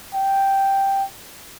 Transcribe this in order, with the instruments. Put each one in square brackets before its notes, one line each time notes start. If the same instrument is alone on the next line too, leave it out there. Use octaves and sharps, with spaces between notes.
[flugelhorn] G5